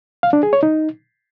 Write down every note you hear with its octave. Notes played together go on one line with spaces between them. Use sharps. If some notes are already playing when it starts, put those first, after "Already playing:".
F5
D4
G#4
C#5
D#4